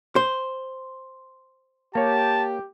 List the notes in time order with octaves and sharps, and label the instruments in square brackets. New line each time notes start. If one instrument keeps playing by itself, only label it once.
[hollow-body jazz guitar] C5
[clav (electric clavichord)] A#3 C#5 [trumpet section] G4 [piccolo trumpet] A5